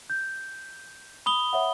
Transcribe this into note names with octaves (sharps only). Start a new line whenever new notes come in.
G6
B5 D#6 G7
C#5 E5 F#5